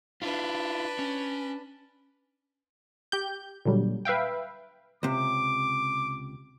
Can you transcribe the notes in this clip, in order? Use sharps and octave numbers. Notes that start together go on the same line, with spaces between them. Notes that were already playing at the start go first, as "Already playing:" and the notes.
D4 E4 F4 B4
C#4
G4 G6
A#2 D3 F#3 G3
B4 E5 F5 G5
C#2 C3 D6